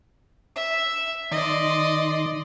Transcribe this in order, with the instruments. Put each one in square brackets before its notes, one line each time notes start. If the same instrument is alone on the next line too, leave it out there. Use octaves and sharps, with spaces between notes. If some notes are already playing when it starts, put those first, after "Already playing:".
[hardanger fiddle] E5
[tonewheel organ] D#3 C6 [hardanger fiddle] D5 D#5